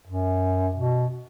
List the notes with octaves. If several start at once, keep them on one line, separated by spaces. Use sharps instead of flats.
F#2
B2